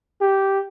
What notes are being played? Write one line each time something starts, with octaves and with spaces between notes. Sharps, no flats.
G4